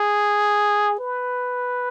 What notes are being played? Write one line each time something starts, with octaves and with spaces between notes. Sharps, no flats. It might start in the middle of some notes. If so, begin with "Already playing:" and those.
Already playing: G#4
B4